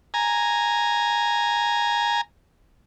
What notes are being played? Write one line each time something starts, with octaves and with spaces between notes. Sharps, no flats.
G#5 A#5